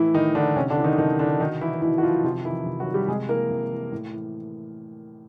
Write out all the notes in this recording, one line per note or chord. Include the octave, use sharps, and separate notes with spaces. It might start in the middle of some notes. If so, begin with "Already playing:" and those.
Already playing: A2 E3 E4
A2 D#3 D#4
D3 E3 D4
C3 C#4
D3 D4
E3
D#3 D#4
C3 D#3 D#4
D3 E3 D4
B2 D#3 D#4
E3 E4
B2 E3 E4
F#4
F3 F4
C3 F3 F4
D#3 E3 E4
C3
F#3 F#4
D#3
G3 G4
C3 G#3 G#4
E3 A#3 A#4
C3
E3
A2
E3